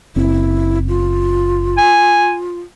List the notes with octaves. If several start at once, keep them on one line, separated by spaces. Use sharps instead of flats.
F#1 C4 E4
F4
G#5